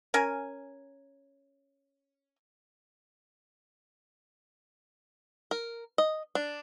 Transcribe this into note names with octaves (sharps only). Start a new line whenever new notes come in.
C#4 A#4 G#5
A#4
D#5
D4